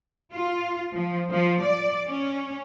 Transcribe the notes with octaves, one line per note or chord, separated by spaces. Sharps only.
F4
F3
F3
D5
C#4